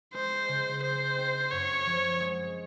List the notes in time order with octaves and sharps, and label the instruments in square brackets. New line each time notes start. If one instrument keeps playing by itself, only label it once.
[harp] G#3 [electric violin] C5
[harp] C#3
[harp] G#3 [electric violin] C5
[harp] C4
[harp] F#2 [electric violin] C#5
[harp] F3
G#3